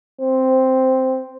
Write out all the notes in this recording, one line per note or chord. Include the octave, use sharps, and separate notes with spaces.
C4